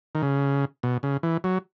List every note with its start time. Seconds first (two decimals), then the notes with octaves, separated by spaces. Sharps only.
0.15 D#3
0.22 C#3
0.83 B2
1.03 C#3
1.23 E3
1.44 F#3